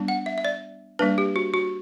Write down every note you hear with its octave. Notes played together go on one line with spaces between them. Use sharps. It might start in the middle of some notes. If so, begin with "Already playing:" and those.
Already playing: G3 B3 D4
F#5
E5
E5
D5
G3 A#3 D4 B4
G4
F#4
F#4